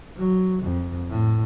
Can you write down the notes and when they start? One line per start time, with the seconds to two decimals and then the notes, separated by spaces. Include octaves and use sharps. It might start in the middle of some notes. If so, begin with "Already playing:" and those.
0.17 F#3
0.63 F2
1.10 A2